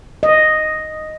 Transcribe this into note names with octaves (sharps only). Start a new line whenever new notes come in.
D#5